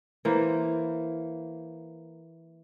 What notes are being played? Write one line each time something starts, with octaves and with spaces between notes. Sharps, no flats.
E3 A#3 C5